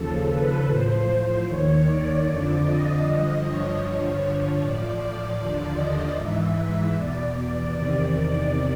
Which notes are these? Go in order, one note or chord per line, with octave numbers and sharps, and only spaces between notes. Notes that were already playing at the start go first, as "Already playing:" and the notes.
Already playing: D#2 C#3 F3 A4
B4
A2 F3 C5
D#2 D#3 C#5
D5
F2 D3 F3
D#5
G2 D3 F3
C#5
G2 D3 F3
A2 F3 D5
D5
D#2 D3 F3
D#5
G#2 E3 E5
E2 B2 D5
E2 C3 D#3